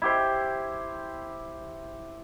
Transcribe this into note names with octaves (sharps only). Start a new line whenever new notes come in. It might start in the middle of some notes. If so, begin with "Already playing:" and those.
E4 G4 C5